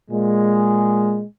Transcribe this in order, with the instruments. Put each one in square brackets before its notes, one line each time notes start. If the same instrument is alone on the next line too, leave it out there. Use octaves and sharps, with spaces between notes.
[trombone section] A#2 G#3